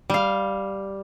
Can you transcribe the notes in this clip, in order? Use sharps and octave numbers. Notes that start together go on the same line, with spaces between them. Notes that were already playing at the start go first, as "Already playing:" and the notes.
G3 F5